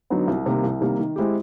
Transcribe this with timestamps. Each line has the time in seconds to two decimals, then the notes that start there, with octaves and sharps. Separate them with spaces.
0.10 D3 F#3 B3 D#4
0.27 C2
0.46 C3 D#3 G3 A#3
0.63 C2
0.81 C3 D#3 G3 A#3
0.99 D#3
1.16 G#3 C4 E4 G4